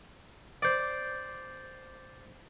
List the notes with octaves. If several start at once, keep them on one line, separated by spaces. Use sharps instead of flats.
C5 D5